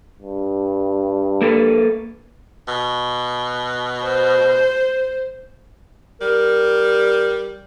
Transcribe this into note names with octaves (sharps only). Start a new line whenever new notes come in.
G2
A#3 A4 B4
B2
C5
G3 A#4